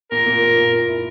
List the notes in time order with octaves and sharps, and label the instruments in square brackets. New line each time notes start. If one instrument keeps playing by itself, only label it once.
[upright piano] A#2 [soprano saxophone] A#4
[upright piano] A#2
A#2
A#2
A#2
E4